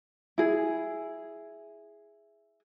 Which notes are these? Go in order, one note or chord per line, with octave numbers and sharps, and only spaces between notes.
E4 G#4